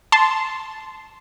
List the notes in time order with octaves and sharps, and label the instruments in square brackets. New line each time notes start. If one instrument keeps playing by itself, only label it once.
[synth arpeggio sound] A5 C6